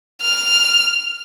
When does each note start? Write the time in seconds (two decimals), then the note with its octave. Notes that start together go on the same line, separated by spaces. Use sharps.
0.22 F6